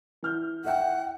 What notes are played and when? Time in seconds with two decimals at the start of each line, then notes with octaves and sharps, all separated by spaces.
0.23 E3 F6 G6
0.65 A4 E5 F#5 G5